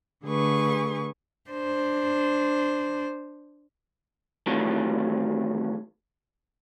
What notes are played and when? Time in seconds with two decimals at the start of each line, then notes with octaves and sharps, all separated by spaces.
0.25 D3 A3 G#4 B4 C#6
1.50 D4 C5
4.46 A2 C3 D#3 E3 F#3